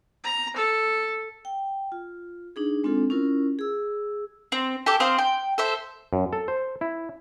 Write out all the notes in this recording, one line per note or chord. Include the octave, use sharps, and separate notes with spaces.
A#5
A4
G5
F4
D4 D#4 G#4
G#3 C4 D4 F4 A4
C#4 E4 F4 A#4
G#4 E6
C4
G4 A4 D6
C4 C5 F5 D#6
G5
A4 C5 E5
F#2
A4
C5
E4